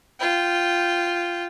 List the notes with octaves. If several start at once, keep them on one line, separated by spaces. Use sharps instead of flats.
F4 G5